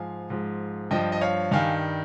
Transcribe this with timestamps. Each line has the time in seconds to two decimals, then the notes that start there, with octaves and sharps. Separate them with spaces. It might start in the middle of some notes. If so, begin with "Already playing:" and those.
Already playing: G#2 F3 F5 G#5
0.30 G#2 F3
0.91 G2 F3 D#5 G5
1.12 D#5
1.21 C#5 F5
1.51 G2 D#3 G3 F5 G#5